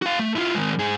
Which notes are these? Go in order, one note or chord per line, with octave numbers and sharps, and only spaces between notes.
F#4 F5
A3
E4 F4
D#3 G#3
G#2 G#4